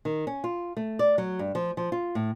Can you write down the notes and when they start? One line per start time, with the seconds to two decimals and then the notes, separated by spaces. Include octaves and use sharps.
0.05 D#3
0.27 C#4
0.44 F4
0.77 A3
0.99 D5
1.18 F#3
1.39 G2
1.55 F3
1.77 F3
1.92 F4
2.15 A2